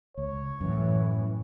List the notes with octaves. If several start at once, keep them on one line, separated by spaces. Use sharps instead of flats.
C#2 C#5
F#2 A2 E3